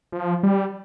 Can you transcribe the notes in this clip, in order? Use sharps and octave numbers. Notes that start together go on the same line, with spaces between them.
F3
G3